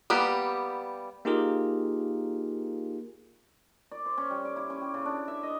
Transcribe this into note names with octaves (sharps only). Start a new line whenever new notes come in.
G3 A#3 B3 G4
A#3 D#4 F4 G4 G#4 A#4
D5
C5
C#4
G3
D5
E4
C#4
G4
C#3
D4
E5
D#5